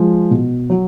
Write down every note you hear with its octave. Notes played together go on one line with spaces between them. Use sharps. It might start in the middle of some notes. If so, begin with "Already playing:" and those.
Already playing: F3 G#3
B2
F#3